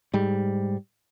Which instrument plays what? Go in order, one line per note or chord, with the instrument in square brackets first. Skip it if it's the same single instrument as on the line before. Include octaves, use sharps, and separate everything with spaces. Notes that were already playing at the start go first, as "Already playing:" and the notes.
[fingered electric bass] G#2 G3